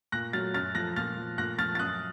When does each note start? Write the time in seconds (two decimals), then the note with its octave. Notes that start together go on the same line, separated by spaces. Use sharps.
0.12 A#2 F#6 A#6
0.33 F#3 F6 A6
0.54 F#2 F6 A6
0.75 F3 F#6 A#6
0.96 A#2 F6 A6
1.17 F3
1.38 A#2 F#6 A#6
1.58 F3 F6 A6
1.75 A6
1.79 F#2 D#6 F#6